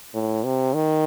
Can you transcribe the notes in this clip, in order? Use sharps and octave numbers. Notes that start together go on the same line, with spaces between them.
A2
C3
D#3